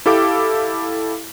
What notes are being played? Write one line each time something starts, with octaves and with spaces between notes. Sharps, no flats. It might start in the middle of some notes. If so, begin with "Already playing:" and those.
E4 G4 A4 F5 D6